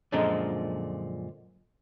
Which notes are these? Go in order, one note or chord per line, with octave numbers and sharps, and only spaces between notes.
F#2 A#2 D3 F3 G#3